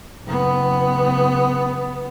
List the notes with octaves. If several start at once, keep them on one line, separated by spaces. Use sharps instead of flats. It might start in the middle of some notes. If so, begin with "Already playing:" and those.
F#1 B3